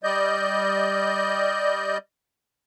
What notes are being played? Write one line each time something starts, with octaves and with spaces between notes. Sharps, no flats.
G3 D5 D#5 G6